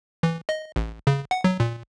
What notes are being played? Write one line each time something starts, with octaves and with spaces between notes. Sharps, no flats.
E3
D#5
A1
C#3
F#5
F#3
A#2